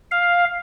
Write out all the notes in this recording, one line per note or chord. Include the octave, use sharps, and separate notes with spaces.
F5